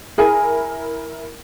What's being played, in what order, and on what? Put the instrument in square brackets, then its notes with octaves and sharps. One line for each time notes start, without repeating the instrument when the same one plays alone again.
[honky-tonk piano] E4 A#4 [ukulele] G#4 G#5